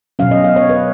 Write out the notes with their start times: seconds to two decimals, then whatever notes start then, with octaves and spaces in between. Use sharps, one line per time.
0.19 B2 F#3 C#4 F5
0.31 D#5
0.44 F5
0.56 C#5
0.70 B4